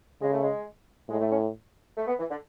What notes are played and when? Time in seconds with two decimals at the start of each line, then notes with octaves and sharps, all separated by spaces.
0.22 C#3 G#3
0.32 A3
0.42 G#3
1.09 A2 G#3
1.20 A3
1.31 C#4
1.97 A3
2.07 B3
2.18 E3
2.29 D3